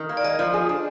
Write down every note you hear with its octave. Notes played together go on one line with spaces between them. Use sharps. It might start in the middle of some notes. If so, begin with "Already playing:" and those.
Already playing: D#3
A#3
D5
G#3 D#5
F3
G#4
D4